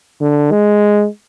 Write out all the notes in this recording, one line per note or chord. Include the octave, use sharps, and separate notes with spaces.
D3
G#3